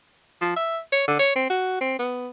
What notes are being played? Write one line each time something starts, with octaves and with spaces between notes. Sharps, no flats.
F3
E5
C#5
D3
C#5
C4
F#4
C4
B3